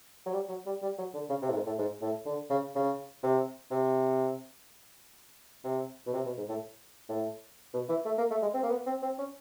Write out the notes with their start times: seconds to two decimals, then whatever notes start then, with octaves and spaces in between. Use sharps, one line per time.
0.26 F#3
0.34 G3
0.49 F#3
0.66 G3
0.82 G3
0.98 F#3
1.14 D3
1.30 C#3
1.42 C3
1.50 A2
1.54 G#2
1.66 A2
1.79 G#2
2.02 A2
2.26 D3
2.50 C#3
2.75 C#3
3.23 C3
3.71 C3
5.64 C3
6.07 B2
6.13 C3
6.26 B2
6.37 G#2
6.49 A2
7.09 A2
7.74 B2
7.89 E3
8.06 A3
8.18 A#3
8.31 A3
8.42 G#3
8.54 C4
8.63 A#3
8.70 B3
8.87 C4
9.02 C4
9.19 C#4